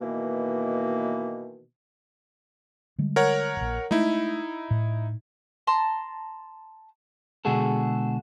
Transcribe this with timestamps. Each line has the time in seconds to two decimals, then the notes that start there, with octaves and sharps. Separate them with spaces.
0.01 B2 D#3 E3 A#3
2.99 D3 G3 G#3
3.16 A#4 C#5 F#5
3.57 E1 A#1
3.91 G#3 A3 D#4 E4
4.71 A2
5.67 A5 A#5 C6
7.45 B2 D3 G#3 F#4 G#4 A4